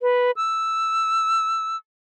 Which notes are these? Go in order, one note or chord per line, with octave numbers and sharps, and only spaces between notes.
B4
E6